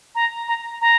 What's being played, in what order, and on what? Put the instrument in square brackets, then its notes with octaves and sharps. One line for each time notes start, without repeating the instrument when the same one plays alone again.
[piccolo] A#5
A#5
A#5